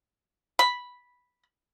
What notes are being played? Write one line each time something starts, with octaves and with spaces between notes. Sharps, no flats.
B5